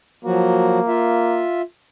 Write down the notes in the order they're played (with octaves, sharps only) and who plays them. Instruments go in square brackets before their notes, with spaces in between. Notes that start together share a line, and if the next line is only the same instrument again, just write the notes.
[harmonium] F3 F#3 F#4 [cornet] A#3
[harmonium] F4 E5